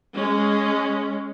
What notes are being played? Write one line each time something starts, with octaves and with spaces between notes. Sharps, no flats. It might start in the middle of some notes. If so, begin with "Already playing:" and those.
G#3 C#4